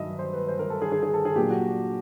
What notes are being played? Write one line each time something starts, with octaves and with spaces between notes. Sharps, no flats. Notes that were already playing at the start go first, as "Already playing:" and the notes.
Already playing: G2 D#3 F#3 D#5 E5
C5
B4
C5
A#4
A4
G#4
G#4
G#4
A4
G#4
A#2 F#3 A#3 D4 G4
F#4